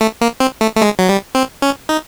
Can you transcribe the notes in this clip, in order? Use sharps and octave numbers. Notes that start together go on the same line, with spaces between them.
A3
A#3
C4
A3
A3
G#3
F#3
G3
C4
C#4
D#4